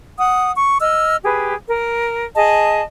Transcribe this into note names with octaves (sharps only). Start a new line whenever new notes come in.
F#5 D#6
C#6
D#5 E6 F6
G4 G#4 B4
A#4
G#4 D#5 A5